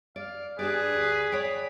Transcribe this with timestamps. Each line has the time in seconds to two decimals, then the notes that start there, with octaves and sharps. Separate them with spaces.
0.16 D5 F5
0.59 D4 G4 G#4 B4 D5
0.94 D2
1.32 C#5 D5 G5 B5